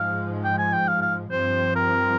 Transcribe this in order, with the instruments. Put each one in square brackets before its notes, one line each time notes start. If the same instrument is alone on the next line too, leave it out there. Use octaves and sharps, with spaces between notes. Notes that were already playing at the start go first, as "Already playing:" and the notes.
Already playing: [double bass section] G#2 F3 G#3 [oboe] F5
[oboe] G5
G#5
G5
F5
F5
[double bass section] G2 F3 C4 [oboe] C5
[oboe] A#4